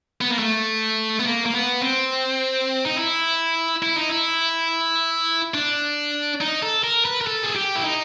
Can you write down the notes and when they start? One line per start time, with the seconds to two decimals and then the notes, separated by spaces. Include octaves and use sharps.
0.21 B3
0.30 A#3
0.39 A3
1.20 B3
1.25 A#3
1.46 A#3
1.54 B3
1.82 C4
2.85 D#4
2.96 E4
3.83 E4
3.96 D#4
4.10 E4
5.54 D4
6.41 D#4
6.62 A4
6.84 A#4
7.05 B4
7.21 A#4
7.27 A4
7.43 G#4
7.56 G4
7.75 E4
7.84 D#4